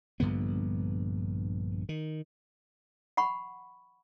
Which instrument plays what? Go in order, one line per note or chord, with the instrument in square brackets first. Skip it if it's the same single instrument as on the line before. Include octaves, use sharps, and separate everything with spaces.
[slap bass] A#1 G2 D3 B3
D#3
[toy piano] F#5 B5 C#6